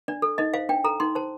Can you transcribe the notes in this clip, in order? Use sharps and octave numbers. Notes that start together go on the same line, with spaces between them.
D4 D5
A4
D#4 D#5
C5 F5
D4 G5
A4 A#5
D#4 C6
C5 A5